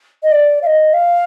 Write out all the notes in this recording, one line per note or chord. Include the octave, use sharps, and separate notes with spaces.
D#5
D5
F5
D#5
F5